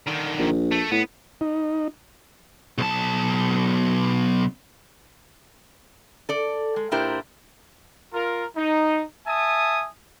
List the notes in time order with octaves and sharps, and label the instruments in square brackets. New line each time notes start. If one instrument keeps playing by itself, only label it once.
[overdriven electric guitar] D3 D#3
[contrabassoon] A#1
[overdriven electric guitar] A3
[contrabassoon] A2 [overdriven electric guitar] B3
[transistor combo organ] D#4
[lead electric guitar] B1 A5
[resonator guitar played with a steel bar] A4 D5
G#3
A#2 D4 E4 G4 A#4 C5
[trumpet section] F4 A#4
D#4
E5 G#5 A5 D#6